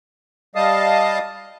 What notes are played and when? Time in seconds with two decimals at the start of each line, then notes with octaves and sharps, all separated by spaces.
0.55 G3 D#5 F5 A5 D#6